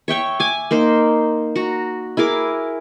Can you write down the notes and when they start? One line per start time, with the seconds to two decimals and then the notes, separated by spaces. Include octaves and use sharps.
0.08 C#5 E5 G5 C#6
0.40 G#5 D6
0.71 A#3 D#4 C5
1.56 F#4 A#5
2.17 E4 G#4 A#4 D6